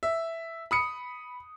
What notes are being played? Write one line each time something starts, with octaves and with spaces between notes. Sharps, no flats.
E5
B5 D#6 C#7